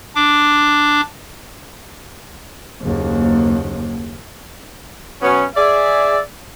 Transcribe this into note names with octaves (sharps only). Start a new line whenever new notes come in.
D4 D6
F#1 D#2
B2 F#3 B3 C#4
G#4 D5 E5